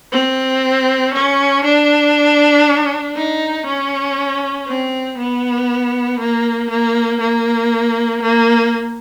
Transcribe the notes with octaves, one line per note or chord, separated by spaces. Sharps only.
C4
C#4
D4
D#4
C#4
C4
B3
A#3
A#3
A#3
A#3